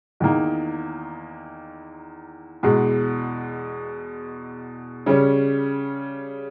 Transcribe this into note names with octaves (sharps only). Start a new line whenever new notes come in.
E2 D#3 A#3 D#4
E2 B2 G#3
C#3 G3 C#4